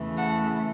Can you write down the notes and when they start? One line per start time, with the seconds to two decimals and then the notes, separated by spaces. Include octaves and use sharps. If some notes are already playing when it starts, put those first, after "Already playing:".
Already playing: E2 C#3 E3 A3
0.17 F#5 A5